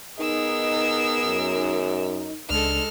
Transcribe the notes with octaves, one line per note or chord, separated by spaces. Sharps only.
B3 D#4 G#4 A#4 D#5 E6
F#2
C#2 G#3 D4 A4 F6